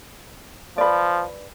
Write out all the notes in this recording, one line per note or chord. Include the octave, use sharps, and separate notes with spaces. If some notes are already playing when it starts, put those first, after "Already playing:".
F3 B4 D5